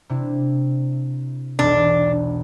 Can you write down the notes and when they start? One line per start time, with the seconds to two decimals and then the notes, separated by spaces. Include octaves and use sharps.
0.09 C3 D4 E4
1.59 E1 B1 D4